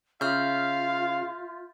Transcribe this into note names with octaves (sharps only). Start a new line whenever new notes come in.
C#3 F4 E5 F5 F6 G6